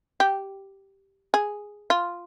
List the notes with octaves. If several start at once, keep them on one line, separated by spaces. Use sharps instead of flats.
G4
G#4
F4